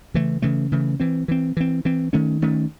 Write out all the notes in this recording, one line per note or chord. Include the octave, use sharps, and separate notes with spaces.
C#3 E3 A3
C#3 E3 A3
C#3 E3 A3
E3 C4
E3 C4
E3 C4
E3 C4
D#3 A3 C#4
D#3 A3 C#4